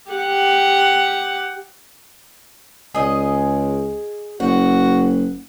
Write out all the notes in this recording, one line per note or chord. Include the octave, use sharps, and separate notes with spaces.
G4 F#5
C#2 G#4 D#5
F#1 F#4 F#5